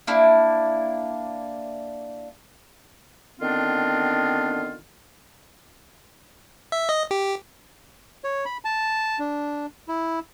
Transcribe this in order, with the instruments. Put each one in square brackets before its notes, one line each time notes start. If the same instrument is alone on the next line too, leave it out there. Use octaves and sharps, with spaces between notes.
[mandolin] A#3 D4 E4
[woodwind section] D3 D#3 B3 C4 D4 F4
[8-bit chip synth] E5
D#5
G4
[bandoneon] C#5
B5
A5
D4
E4